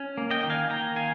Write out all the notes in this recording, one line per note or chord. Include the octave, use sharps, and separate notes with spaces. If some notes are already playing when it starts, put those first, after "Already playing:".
Already playing: C#4
A#3
D#5 G5
D#3 G5
F5 G#5
A#3 G5 A#5
D#3 F5 G#5